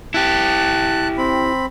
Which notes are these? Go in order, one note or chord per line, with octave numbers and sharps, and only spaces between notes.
E4 G4 A5 F#6
C4 B5